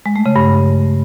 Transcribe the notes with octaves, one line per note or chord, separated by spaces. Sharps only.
G#3
A3
C#3
G2